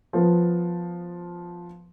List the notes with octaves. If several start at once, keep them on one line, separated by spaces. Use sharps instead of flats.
F3 B3